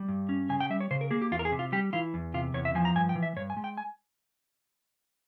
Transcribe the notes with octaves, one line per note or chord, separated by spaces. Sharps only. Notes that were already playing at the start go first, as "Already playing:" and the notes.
Already playing: G3
G2
C#4
C#3 G#5
G5
G3 E5
C#5
C#3 C5
A#4
A#3 G#4
G4
E2 F4
A#4
G#4
C3
F4
G3 G4
E3 F4
E2
C3 F4
E2 C#5
E5
F3 G#5
A#5
G2 G#5
G5
E3
E5
G2 C#5
G#5
G#3
G5
G#5